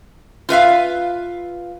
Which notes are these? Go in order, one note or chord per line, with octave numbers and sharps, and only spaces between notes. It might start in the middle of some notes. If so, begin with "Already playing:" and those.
F4 B4 E5 F5